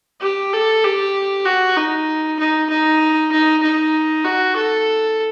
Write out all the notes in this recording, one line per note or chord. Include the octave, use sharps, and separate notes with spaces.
G4
A4
G4
F#4
D#4
D#4
D#4
D#4
D#4
F#4
A4